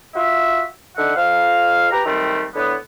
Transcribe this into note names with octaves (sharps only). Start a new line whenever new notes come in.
F4 F#4 E5
D3 D#4 E5 F#5
F2 F5
G4 B4 A#5
D#3 F#3 G3 A3 C4
A2 D3 B3